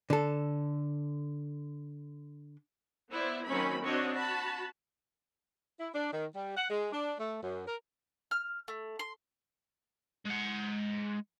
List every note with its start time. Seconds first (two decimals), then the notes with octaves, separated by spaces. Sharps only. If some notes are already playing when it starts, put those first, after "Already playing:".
0.10 D3 A4
3.11 B3 E4 C5 D5
3.47 D#3 F#3 A#3 C4 C#4 B5
3.84 C4 D4 F#4 C#5 D#5
4.13 F#4 A5 B5
5.79 E4
5.94 D4
6.12 D#3
6.34 G3
6.56 F#5
6.70 G#3
6.92 D4
7.18 A3
7.42 F#2
7.67 A#4
8.31 F6
8.68 A3
8.99 C6
10.25 G#3 F#5